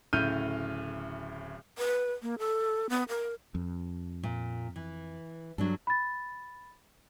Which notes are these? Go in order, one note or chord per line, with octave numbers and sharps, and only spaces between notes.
D1 A2 C#3 F6 G6 D#7
B4
A#3
A4
B3
A#4
F2
A#2
E3
G2 F#3 D4 A4
B5 A6